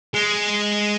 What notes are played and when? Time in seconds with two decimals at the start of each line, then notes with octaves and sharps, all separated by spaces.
0.14 G#3